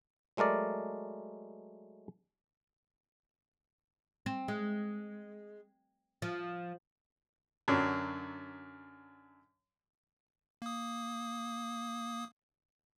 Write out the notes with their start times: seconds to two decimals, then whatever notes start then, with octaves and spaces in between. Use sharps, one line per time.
0.37 F#3 G#3 A3 A#4 D5
4.26 C4
4.48 G#3
6.22 F3
7.68 F#2 D3 F#3 D4
10.62 A#3 D#6